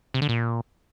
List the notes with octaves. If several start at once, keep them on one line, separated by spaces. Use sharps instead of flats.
C3
D3
A#2